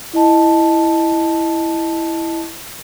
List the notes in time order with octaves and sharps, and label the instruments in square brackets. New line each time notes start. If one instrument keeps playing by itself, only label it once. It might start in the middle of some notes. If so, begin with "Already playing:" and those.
[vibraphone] E4 D#5 A5